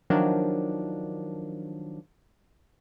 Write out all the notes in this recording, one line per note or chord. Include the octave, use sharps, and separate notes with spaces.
D#3 F3 F#3 D4